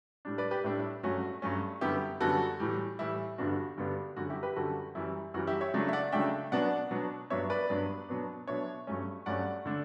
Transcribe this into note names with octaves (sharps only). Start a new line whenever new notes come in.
A2 G3 D4
B4 D5
G4 B4
A2 G3 D4 E4
E4
G2 F#3 A3 C#4 F#4
G2 F#3 A3 C#4
F#2 D3 G3 B3 E4 G4
F#2 D3 G3 B3 F#4 A4
A2 E3 G3
A2 E3 G3 E4
G2 D3 G3 B3 D4 F#4
G2 D3 G3 B3 D4
F#2 D3 G3 F#4
E4 G4
G4 B4
F#2 D3 G3 F#4 A4
F#2 E3 G3 E4
F#2 E3 G3 F#4
E4 G4
C#5 E5
C#3 F#3 A3 D4
E5
D5 F#5
C#3 F#3 A3 D4 E5 G5
B2 F#3 B3 D4 D5 F#5
B2 F#3 B3 D4
G2 F#3 B3 D4 C#5 E5
B4 D5
G2 F#3 B3 D4
B2 F#3 B3 D4
B2 F#3 B3 D4 C#5 E5
G2 F#3 A3 C#4
G2 F#3 A3 C#4 D5 F#5
D3 A3 D4